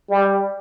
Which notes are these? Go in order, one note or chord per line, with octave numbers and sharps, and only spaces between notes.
G3